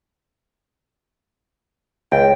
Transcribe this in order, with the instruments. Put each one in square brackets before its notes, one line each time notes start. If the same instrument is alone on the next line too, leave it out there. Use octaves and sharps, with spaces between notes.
[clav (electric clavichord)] C#2 [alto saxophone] G5